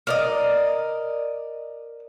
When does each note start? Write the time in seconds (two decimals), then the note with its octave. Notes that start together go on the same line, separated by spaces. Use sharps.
0.07 A#4 D5 D#5